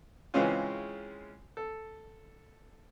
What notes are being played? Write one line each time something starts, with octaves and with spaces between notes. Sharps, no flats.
C#3 E3 G#3 C4 C#4 F4
A4